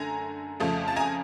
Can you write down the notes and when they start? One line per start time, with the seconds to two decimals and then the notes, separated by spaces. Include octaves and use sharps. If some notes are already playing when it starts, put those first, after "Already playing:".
Already playing: F#2 D3 A3 G#5 A#5
0.60 F2 C#3 F3 A3
0.88 A5
0.96 G#5 A#5